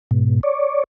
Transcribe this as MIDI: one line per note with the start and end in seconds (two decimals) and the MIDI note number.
0.11 0.41 44
0.11 0.41 47
0.43 0.84 73
0.43 0.84 74